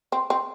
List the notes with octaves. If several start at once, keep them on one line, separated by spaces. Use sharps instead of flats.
C4
C4